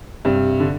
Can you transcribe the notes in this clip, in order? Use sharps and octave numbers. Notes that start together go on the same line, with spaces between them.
G2 C3
D3